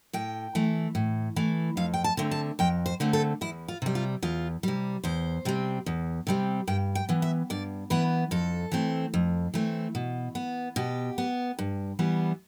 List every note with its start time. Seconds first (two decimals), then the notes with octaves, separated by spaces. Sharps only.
0.13 A2 G5
0.55 E3 A3
0.95 A2
1.36 E3 A3
1.77 F2 F5
1.94 G5
2.04 A5
2.17 D3 A3 C4
2.31 A5
2.59 F2 G5
2.86 C5
3.00 D3 A3 C4
3.13 A4
3.41 E2 E4
3.68 F4
3.82 C3 G3
3.95 F4
4.22 E2 F4
4.63 C3 G3
5.04 E2 C5
5.45 C3 G3 C4
5.86 E2
6.27 C3 G3 C4
6.67 G2 G5
6.95 G5
7.09 E3 B3
7.22 E5
7.50 G2 D5
7.90 E3 B3 B4
8.31 F2 A4
8.72 E3 A3 C4
9.14 F2
9.54 E3 A3 C4
9.95 B2
10.35 B3
10.76 B2 G4
11.18 B3
11.59 G2
11.99 E3 G3 B3